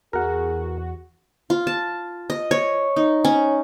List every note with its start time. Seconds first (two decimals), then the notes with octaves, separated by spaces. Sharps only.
0.13 E2 F#4 G#4 A#4 F#5
1.50 F4
1.67 A5
2.30 D#5
2.51 C#5
2.96 D#4
3.25 C#4